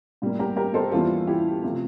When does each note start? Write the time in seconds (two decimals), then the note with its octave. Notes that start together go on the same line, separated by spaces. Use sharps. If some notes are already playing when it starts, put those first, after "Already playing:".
0.22 A2 G3 A#3
0.39 G4 A#4
0.56 G4 A#4
0.74 A4 C5
0.92 E2 E3 G3 A#3 F4 A4
1.27 E4 G4
1.63 C3 F3 A3 F4